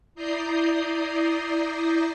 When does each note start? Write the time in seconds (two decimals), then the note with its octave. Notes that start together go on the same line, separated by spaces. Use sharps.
0.15 E4 D5 A#5 D#6 G6 C7